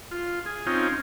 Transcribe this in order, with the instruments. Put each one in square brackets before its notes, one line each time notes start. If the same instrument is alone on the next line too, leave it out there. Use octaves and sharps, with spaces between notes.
[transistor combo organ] F4
G#4
C4 C#4 D#4 F4